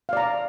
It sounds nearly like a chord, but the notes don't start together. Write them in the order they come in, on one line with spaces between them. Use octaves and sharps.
F5 D5 A#5